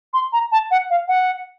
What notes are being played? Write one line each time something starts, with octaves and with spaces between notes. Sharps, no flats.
C6
A#5
A5
F#5
F5
F#5